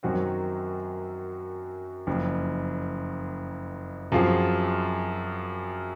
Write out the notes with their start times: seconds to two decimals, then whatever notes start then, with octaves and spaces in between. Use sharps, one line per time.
0.03 F#2 D#3 F#3 C4 F#4
2.07 F#1 F2 C#3
4.12 F#2 F3 C4 F4 G#4